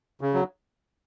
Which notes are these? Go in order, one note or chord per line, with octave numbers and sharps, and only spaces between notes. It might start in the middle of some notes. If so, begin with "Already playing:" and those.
C#3
F#3